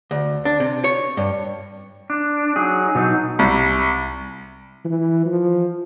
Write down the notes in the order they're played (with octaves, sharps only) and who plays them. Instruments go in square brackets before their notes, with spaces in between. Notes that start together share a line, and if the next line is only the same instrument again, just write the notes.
[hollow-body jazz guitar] D2
D4
C3
C#5
G2
[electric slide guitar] D4
F#3 D#4 G#4
B2 F#3 D#4
[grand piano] C2
[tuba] E3
F3